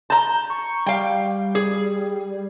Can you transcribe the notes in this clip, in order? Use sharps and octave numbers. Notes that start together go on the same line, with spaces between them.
A5 A#5 G6
C#6
G3 F5 G5
G#4